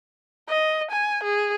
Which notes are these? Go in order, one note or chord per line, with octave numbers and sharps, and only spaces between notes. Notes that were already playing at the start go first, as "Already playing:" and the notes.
D#5
G#5
G#4